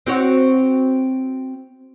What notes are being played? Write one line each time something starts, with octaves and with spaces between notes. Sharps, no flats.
C4 F#4 C#5